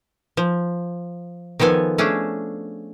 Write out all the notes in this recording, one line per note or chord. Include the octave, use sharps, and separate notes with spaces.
F3
D#3 F3 B3 A4 G#5
A3 C#4 D4 G#4